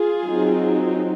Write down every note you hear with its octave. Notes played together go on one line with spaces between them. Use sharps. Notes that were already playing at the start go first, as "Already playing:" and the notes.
Already playing: F4 G#4
F#3 C4 D#4